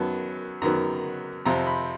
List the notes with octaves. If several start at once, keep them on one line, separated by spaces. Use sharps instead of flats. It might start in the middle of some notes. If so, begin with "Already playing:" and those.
Already playing: F#2 D#3 F#3 B3 A5
F#2 D#3 F#3 B3 A#5
F2 C3 F3 A#5
B5